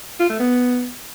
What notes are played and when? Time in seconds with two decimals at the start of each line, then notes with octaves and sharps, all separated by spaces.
0.20 F4
0.30 A3
0.40 B3